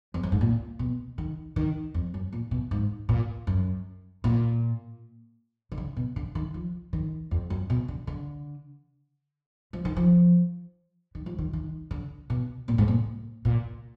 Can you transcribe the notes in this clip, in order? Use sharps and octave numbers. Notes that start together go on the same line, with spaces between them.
F2
F#2
G#2
A#2
B2
D#3
D#3
F2
F#2
A#2
B2
G#2
A#2
F#2
A#2
D#3
D3
B2
D3
D#3
F3
D#3
F2
F#2
B2
D3
D3
F3
D#3
F3
D#3
F3
D#3
D#3
D3
B2
A#2
G#2
A#2
A#2